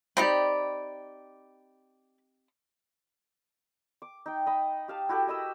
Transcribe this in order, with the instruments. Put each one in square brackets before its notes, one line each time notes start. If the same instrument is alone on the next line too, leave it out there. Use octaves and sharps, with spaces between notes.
[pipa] C4 D#4 G4 [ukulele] D5 B5
[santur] D6
D#4 G5
D#5 B5
G4 F5 A5
E4 F#4 G4 A4
A#4 D#5 B5 E6